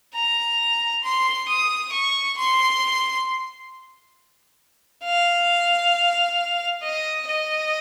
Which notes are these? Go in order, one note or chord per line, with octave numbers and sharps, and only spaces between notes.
A#5
C6
D#6
C#6
C6
F5
D#5
D#5